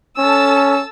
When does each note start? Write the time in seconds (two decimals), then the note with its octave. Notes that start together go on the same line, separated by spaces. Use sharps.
0.18 C#4 A4 A5 E6